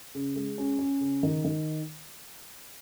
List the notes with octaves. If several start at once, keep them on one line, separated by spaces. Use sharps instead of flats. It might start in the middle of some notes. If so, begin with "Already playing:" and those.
C#3
G#3
C#4
C#4
C#3
D#3
D#3